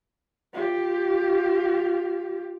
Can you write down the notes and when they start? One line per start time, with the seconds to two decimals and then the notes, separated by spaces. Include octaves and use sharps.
0.53 F4 G4